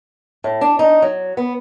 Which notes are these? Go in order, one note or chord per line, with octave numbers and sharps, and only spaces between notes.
A2
D4
D#4
F#3
B3